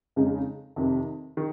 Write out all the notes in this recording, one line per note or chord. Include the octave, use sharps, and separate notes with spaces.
F2 C#3 G#3 D#4
F2 C3 D#3
D#3